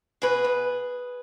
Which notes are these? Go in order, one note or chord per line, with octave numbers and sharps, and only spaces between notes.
B2 G#4 B4
B2